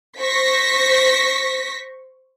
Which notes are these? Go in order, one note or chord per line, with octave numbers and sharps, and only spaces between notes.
C5 C#6 A#6 B6